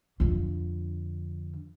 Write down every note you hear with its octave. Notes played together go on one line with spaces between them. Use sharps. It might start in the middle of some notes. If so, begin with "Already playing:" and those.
F2 D3